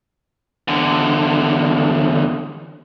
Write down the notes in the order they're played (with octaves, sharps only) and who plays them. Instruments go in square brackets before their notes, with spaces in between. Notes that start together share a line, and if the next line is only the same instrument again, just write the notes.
[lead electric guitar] E2 D3